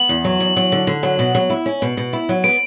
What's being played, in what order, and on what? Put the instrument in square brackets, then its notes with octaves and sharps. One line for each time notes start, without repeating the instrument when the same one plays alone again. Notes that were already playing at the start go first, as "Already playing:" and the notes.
Already playing: [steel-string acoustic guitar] B3 [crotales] F#7
[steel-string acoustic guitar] E2
F#3
E2
F#3
D3
D3
F#3
B2
F#3
E4
C#4
B2
B2
E4
F#3
[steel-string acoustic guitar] B3 [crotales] D7